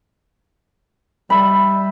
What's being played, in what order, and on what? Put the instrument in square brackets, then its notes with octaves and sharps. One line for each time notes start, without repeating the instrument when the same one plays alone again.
[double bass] G3 [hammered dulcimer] E5 B5